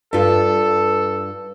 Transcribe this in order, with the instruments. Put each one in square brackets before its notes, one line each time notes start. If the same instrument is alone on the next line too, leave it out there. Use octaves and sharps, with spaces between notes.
[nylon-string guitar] G2 F4 [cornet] A4